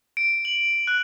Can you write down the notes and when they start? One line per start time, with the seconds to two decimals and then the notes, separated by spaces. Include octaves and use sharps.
0.17 D7
0.45 F#7
0.87 F#6